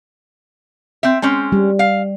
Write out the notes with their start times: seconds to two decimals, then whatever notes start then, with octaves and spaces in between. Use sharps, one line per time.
1.03 C4 E5
1.22 G#3 C4 C#4
1.52 G3
1.79 F5